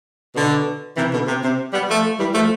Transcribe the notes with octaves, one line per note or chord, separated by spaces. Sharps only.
B2 D3
C3 E3
B2 D3
C3
C3
G3 B3
F3 A3
E3 G3
F3 A3